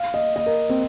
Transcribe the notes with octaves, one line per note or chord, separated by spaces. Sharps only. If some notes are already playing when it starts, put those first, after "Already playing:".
Already playing: F5
D#5
D#5
A#4
C4